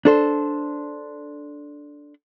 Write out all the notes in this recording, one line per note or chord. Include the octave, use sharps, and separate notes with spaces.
D4 A4 C5